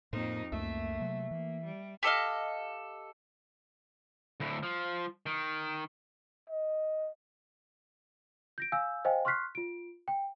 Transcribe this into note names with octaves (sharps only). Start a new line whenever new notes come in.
F2 A2 A#3 D#4 A#4 C5
C#2 F#2 A3 A#3 E5
C3 F#3
E3 A#3
G3
G4 A4 D#5 F5
D2 A2
F3
D#3
D#5
G6 A#6 D7
F5 G#5 E6 G6
C5 D#5 F5 G5 G#5
C6 C#6 F6 F#6 B6 C7
F4 D7
G5